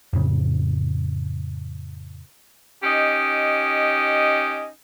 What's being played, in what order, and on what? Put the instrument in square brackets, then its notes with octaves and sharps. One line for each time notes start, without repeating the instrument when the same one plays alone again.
[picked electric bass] F2 A2 C#3
[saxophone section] C#4 D#4 G4 D#5